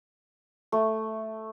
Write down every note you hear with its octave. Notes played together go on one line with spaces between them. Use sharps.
A3